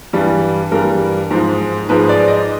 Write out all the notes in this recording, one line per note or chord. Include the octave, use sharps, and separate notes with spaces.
G2 E3 G3
G2 E3 G3 A#4
G#2 F3 G#3
G#2 F3 G#3 B4
D5
D#5